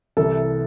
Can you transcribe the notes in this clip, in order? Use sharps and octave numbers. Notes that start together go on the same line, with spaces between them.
C2 C3 E3 A4